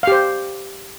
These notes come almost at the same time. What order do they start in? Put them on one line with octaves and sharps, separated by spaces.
F5 G4 C5